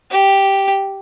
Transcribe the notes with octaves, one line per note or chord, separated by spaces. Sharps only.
G4